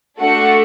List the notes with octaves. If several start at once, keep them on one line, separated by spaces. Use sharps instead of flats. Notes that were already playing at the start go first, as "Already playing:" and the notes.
A3 D4 F#4 A4 F#5